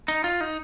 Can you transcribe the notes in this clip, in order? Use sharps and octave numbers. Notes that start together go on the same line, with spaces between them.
D#4
F4
D#4